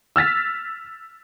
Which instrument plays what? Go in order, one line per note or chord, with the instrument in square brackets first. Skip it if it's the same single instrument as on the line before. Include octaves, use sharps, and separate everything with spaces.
[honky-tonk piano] E6 F6 A6 B6